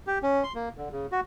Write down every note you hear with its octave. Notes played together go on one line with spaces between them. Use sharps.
G4
C#4
C6
A#3
D3
C#3
F#4